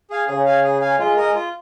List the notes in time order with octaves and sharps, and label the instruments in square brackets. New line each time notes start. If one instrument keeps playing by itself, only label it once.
[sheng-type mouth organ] G#4 F5 G#5
[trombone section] C#3 [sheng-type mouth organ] G#4
[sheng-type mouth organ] F5 G#5
G#4
F5 G#5
[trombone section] G#3 [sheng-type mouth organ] F4
[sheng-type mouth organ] A#4 D#5
F4